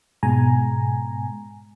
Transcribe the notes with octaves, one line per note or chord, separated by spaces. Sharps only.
G#2 B2 G#3 G#5 A#5